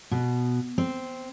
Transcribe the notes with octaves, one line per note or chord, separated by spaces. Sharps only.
B2
C4